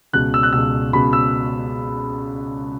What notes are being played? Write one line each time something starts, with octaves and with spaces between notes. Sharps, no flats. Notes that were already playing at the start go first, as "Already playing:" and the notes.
C#2 B2 F#6
E6
F#6
C#2 B2 E6
C#2 B2 B5
E6